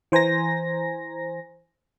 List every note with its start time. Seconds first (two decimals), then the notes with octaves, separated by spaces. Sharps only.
0.12 E3 C5 G#5 A#5 A#6